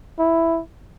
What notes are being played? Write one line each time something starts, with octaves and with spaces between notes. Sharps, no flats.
E4